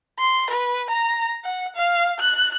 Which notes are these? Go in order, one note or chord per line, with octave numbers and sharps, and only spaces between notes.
C6
B4
A#5
F#5
F5
F#6